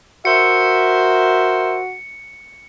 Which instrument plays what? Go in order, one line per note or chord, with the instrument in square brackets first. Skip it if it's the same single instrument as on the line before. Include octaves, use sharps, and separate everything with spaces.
[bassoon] F#4 [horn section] A#4 C5 E5 [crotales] C#7